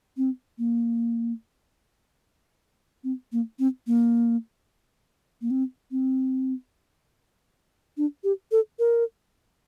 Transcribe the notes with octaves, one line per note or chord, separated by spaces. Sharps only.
C4
A#3
C4
A#3
C4
A#3
A#3
C4
C4
D4
G4
A4
A#4